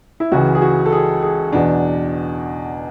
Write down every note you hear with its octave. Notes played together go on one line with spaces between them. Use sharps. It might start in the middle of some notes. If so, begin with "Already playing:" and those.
E4
C#2 C#3 E3 F#4
G#4
F#4
A4
G#4
G#4
E2 B2 D4